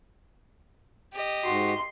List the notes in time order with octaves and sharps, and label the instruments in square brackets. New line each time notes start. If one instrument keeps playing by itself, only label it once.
[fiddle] G4 D#5
[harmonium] G#2 F#4 [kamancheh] C6